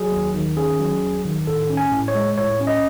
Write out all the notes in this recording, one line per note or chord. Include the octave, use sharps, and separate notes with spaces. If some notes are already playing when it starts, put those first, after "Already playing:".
Already playing: F#3 G#4
D#2
D#3
C#4 G#4
F#3
D#2
D#3
A2 A4
C#4
G#5
A2
C#5
G#3
A2 C#5
C#4
D#5